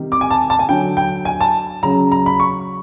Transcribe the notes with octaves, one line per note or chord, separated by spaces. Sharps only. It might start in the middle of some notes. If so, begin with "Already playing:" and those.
Already playing: C3 D#3 G3
D6
G#5
A5
A5
G#5
D3 F#3 G5
G5
G#5
A5
C#3 F#3 A#5
A#5
B5
C#6